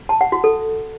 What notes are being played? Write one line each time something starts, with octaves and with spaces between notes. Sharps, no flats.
A5
F#5
F#4
A4